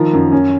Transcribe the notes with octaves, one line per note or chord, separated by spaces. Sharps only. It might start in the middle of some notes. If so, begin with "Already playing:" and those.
Already playing: D#3 F3 A#5
F#2
C#4